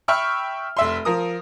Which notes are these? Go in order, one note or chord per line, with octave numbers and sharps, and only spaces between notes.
E5 G5 B5 C#6 F6
F1 E5 C6
F3 A#4 D#6